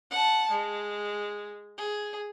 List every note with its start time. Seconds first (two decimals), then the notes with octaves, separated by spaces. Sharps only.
0.11 F#5 A5
0.51 G#3
1.78 G#4